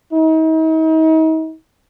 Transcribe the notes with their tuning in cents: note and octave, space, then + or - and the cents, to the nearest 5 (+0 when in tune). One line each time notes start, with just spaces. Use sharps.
D#4 +40